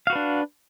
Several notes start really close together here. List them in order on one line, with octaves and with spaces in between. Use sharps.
F5 F#4 B4 D4